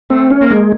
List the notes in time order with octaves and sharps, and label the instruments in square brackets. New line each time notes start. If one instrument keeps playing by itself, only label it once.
[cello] A3 [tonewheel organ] C4
[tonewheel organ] C#4
[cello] A#3
[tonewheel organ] G#3